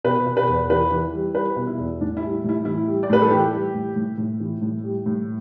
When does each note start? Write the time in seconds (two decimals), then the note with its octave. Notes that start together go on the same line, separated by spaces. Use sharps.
0.04 B2 B4
0.26 B2
0.37 B4
0.47 E2
0.70 E3 B4
0.91 E3
1.14 G3
1.35 G3 B4
1.56 B2
1.67 E4
1.78 E2
2.01 A2 D4
2.17 E4
2.22 G3
2.44 A2 E4
2.65 E3 E4
2.88 G3
3.03 D5
3.10 A2 B4
3.21 A4
3.31 E3 G4
3.53 G3
3.74 A2
3.96 A2
4.18 A2
4.40 E3
4.62 A2
4.83 G3
5.06 A2